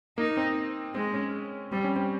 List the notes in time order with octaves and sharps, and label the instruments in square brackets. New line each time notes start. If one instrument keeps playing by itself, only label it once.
[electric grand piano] A#3 [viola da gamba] D#4
[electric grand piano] C4
[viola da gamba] G#3 [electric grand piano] C4
[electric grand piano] C#4
[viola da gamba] G3 [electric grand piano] C4
[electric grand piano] C#4
C4